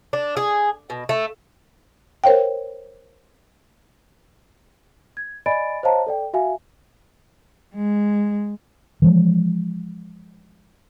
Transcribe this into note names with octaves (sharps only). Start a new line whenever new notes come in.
D4
G#4
B2
A3
A#4 C5 C#5 F5 G5
G#6
D5 D#5 G#5 B5 A6 D7
C5 C#5 D#5 F5 A5 A#5
A4 D5 G5
F#4 E5 F5 G#5
G#3
E3 F3 G#3